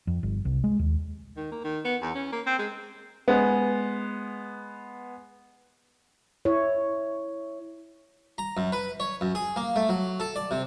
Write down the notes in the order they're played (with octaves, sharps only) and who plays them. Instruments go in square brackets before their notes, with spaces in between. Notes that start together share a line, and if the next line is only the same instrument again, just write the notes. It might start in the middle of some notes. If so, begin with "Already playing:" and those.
[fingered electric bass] F2
G1
C2
G#3
D#2
[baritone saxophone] D#3
A#3
D#3
B3
E2
C#4
A#3
C4
G#3
[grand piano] G#3 B3
[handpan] E4 C#5
[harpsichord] A#5
F#2
B4
C#5
F#2
G#4
A#3
A3
F#3
A4
D5
C3